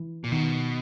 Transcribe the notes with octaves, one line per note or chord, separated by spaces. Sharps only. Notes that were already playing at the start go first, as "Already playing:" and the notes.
Already playing: E3
A#2
B2 D#3